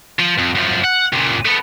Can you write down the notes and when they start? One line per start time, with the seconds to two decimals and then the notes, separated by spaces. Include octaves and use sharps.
0.19 F3
0.39 F2
0.56 F#2 F3
0.84 F#5
1.13 C#2 A#2
1.45 A3 B3